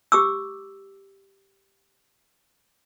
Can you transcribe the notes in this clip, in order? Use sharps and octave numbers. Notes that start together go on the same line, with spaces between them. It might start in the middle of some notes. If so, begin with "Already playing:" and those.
G4 D6 E6